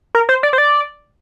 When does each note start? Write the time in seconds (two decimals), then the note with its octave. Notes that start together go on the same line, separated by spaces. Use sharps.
0.15 A#4
0.29 C5
0.43 D5
0.53 C5
0.58 D5